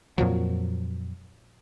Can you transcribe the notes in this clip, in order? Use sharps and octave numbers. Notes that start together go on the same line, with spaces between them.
F2 A#2 F3 F#3